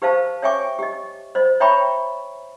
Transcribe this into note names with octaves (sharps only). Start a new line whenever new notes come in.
G4 B4 C5 F5 A5
C#5 E5 G5 G#5 C#6 D6
G4 D#5
C5 D#5
C#5 E5 G5 A#5 B5 C#6